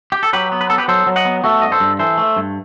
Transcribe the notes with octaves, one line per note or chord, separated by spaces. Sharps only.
G4
A4
F#3 G4 B4
B3
B4
B3 A4
G4 B4
F#3 A4 C5
F#3
D#5 F#5
B3
A3 F#4 A4
G2 D#5
A4 C5
G2
E3 A4 C5
A3
G2